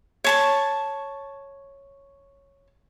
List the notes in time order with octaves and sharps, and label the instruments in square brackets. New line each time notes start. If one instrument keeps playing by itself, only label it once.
[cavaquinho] C#5 A5 C#6